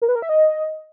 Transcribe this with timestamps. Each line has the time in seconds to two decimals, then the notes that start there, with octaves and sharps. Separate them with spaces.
0.02 A#4
0.08 B4
0.15 A#4
0.22 E5
0.29 D#5